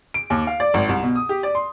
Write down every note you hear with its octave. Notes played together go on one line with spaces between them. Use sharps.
D7
D#2
F5
D5
G#1
C2
B2
D#6
G4
D5
C6